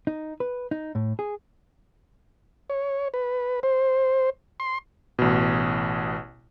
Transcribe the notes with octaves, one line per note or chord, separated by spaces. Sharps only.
D#4
B4
D#4
A2
G#4
C#5
B4
C5
C6
A1 B2